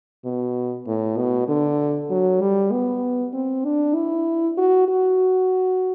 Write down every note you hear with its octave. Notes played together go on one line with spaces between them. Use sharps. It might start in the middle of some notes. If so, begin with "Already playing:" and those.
B2
A2
B2
D3
F#3
G3
B3
C4
D4
E4
F#4
F#4